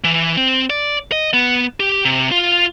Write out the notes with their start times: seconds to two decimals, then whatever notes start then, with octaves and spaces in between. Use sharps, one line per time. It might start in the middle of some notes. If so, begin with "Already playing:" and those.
0.04 E3
0.37 C4
0.70 D5
1.12 D#5
1.34 B3
1.80 G4
2.05 C3
2.31 F4